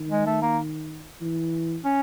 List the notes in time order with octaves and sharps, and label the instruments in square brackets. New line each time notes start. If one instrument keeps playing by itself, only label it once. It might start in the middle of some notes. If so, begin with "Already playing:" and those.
Already playing: [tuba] D#3
[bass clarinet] G#3
A3
A#3
[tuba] E3
[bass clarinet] C#4